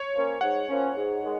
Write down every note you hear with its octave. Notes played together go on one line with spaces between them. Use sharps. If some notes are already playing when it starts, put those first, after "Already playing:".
Already playing: C#5
F3 A#3 C#4
G#2 F#5
F3 A#3 C#4
G#2
D#3 G#3